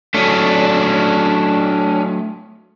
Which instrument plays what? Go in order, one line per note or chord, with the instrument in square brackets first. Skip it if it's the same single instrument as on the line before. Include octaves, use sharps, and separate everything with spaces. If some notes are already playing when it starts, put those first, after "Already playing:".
[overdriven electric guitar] F#3 A3 [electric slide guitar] C#4 D4